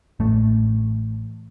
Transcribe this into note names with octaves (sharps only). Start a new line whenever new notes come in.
A1 A3